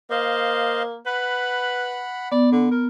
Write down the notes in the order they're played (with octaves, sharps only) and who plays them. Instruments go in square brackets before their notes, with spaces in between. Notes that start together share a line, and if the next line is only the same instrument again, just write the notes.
[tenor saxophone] A#3 [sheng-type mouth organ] C5 D#5 F5
[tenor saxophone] B4 [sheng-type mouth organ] F#5 B5
[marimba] B3 [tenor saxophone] D5
[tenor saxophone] D3
A#4